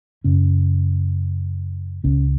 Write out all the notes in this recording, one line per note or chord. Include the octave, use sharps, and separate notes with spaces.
F#2 C#3 C#4
C#2 C#3 C#4